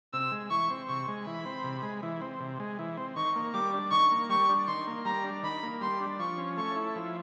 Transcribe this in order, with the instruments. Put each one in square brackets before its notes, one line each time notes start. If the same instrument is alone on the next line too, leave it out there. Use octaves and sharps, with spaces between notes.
[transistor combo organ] C3 [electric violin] E6
[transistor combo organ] G#3
[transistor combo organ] E3 [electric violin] C#6
[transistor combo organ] C4
[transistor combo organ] C3 [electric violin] C#6
[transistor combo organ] G#3
[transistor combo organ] E3 [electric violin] B5
[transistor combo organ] C4
C3
G#3
E3
C4
C3
G#3
E3
C4
[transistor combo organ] D#3 [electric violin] C#6
[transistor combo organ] A#3
[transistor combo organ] G3 [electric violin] D6
[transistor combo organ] D4
[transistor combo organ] D#3 [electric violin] C#6
[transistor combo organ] A#3
[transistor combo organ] G3 [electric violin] C#6
[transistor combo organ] D4
[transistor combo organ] D#3 [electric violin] C6
[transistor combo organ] A#3
[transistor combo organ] G3 [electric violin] A#5
[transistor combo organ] D4
[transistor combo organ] D#3 [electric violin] B5
[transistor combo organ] A#3
[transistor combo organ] G3 [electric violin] C6
[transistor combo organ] D4
[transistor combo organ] F3 [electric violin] C#6
[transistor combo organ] C#4
[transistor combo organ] A3 [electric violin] C#6
[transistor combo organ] E4
F3